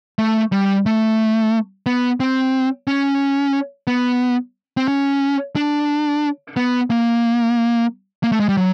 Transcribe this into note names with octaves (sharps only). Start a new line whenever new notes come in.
A3
G3
A3
B3
C4
C#4
B3
C4
C#4
D4
B3
A#3
A#3
A3
G#3
G3
F#3